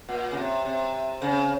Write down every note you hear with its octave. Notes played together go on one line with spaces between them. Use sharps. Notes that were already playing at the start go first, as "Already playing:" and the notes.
A#2
C#3
C3
C3
C#3